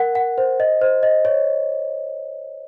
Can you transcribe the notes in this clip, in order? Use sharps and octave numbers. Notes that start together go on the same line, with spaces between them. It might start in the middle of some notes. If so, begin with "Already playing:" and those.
Already playing: A#4 F#5
F#5
C5
D#5
C5
D#5
C#5